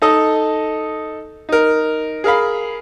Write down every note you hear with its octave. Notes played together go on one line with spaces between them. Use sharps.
D#4 A4 D#5
D#4 A#4
G#4 A#4 F5 B5